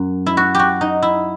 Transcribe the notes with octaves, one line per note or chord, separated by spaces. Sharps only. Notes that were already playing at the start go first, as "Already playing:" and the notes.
Already playing: F#2
E4
F#4
F#4 G4
D#4
E4